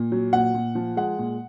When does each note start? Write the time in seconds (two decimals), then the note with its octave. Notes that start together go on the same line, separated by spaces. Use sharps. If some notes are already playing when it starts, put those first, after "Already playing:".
Already playing: A#2
0.12 F#3
0.33 A#2 F#5
0.54 A#2
0.75 F3
0.97 G#3 F#5
1.19 A#2